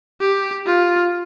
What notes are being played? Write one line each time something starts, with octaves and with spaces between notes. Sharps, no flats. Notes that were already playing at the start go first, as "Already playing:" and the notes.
G4
F4